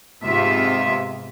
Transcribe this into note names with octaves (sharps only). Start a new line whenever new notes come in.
G#2 C3 G#3 B3 F4 E5